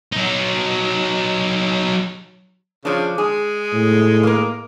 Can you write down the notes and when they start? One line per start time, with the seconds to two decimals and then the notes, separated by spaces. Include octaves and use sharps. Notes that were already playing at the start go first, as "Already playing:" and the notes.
0.12 F#3 D#4
2.85 C#3 F3 D4
3.18 G#3 G#4
3.73 A2
4.23 A#3 A#4